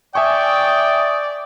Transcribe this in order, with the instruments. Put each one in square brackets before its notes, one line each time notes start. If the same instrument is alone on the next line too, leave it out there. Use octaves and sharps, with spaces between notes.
[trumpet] D5 [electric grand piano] E5 G#5 C#6 [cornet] G5 [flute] D#6